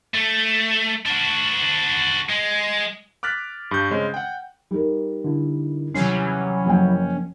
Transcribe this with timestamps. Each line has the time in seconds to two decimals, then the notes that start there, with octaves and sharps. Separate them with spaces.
0.14 A3
1.06 D4 F#4
2.29 G#3
3.23 D6 F6 F#6 A6 B6
3.71 G2 G6
3.90 C#3 G#3 C4 C#4
4.14 F#5 G5
4.71 G3 D#4 A#4
5.24 D3 D4 E4
5.95 D#2 C3 E3 F#3 G3 C#4 C7
6.66 F#1 F3 A#3 G5